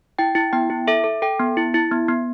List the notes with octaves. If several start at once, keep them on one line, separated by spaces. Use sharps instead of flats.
E4 G5
E4
B3 G5
E4
A4 E5
A4
A4 G5
B3
E4
E4
B3
B3